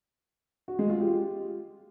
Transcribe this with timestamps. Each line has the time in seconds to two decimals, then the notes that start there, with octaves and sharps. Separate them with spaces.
0.68 F#4
0.79 G#3
0.90 F4
1.00 G4